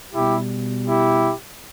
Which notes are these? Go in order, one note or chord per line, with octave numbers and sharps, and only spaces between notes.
B2 G3 E4 G4
E4 G4